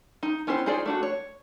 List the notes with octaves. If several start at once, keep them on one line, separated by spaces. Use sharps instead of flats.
D#4
B3 C#4 E4 G4 C5
D#4 F4 G#4 C5 D5
A3 D4 F#4
C#5